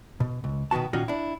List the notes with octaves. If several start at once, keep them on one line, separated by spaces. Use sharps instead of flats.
B2
C#2
B2 D#3 B3 F#4 A5
A#2 D#3 C#4 D#4 F4 F#4
D4 E4